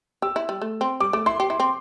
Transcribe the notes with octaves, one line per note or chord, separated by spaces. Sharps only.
G4 E6
E4
G3
A3
C4
G3 D6
A3 D6
E4 C6
G4
E4
C4